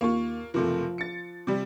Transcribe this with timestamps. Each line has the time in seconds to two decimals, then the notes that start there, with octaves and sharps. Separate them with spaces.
0.01 D#2 A#3 F4 C#6
0.54 F#1 C3 F3 A3 F4
0.98 A6 C#7
1.47 C3 G3